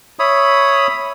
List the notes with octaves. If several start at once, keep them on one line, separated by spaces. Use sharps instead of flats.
C#5 E5 B5 D#6